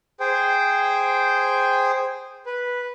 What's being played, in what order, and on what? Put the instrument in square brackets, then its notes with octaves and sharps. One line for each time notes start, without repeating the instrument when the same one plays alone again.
[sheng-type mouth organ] G#4 C5 G5
B4